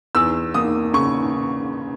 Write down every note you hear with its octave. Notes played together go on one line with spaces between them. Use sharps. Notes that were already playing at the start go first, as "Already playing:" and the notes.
E2 E6
A#3 D#6
C#3 C#6